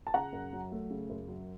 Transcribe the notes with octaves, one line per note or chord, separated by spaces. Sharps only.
A5
C#3 F#5 A#5
F#2
F#3
A3
C#3
F#2
F#3